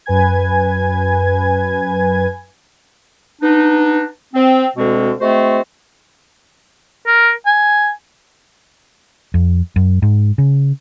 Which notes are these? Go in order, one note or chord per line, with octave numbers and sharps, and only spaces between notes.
F#2 B4 G#5 G#6
B3 D4 D#4
C4
D2 B2 G#3 C4
G#3 A3 C4 F#4 C5
A#4
G#5
F2
F#2
G#2
C#3